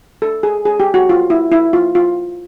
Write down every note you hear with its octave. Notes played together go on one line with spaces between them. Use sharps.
A4
G#4
G#4
G4
F#4
F4
E4
E4
F4
F4